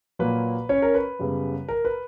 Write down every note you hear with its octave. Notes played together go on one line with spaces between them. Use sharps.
A#2 F#3 A#3 B4
C#4 C#5
A#4
B4
F#2 C#3 G3 B3
A#4
B4